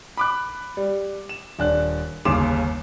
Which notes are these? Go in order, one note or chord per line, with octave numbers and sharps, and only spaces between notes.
B5 D6 F#6
G3
E7
D#1 D4 F#6
G1 D#2 C#3 C6 D6 E7